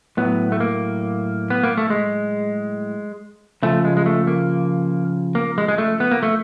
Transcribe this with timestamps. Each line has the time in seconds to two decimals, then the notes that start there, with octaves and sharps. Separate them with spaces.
0.17 A2 F#3 B3
0.52 A3
0.60 A#3
1.50 B3
1.64 A#3
1.78 A3
1.90 G#3
3.63 C#3 F3 A3
3.85 G#3
3.97 G#3
4.06 A3
4.27 A#3
5.35 A#3
5.58 G#3
5.68 G#3
5.78 A3
6.00 B3
6.12 A#3
6.23 A3